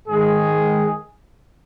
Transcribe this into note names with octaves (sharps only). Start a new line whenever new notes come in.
G#2 D#3 G#3 G#4